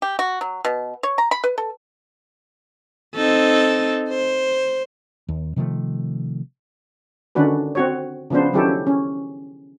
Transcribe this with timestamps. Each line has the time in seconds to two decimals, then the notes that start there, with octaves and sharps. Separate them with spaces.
0.02 G4
0.19 F#4
0.41 F#3
0.65 B2
1.03 C#5
1.18 A#5
1.31 B5
1.44 B4
1.58 A4
3.15 C4 D#4 A4
4.09 C5
5.29 D#2
5.56 C3 D#3 F3 A3
7.35 D3 D#3 C#4 D4 F#4 B4
7.75 C4 F#4 C#5
8.30 C#3 F3 B3 D4 C5
8.53 D#3 F#3 C#4 E4 G4 A4
8.87 C#4